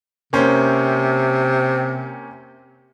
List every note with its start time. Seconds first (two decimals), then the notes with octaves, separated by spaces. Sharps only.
0.33 C3 A#3 C#4 C5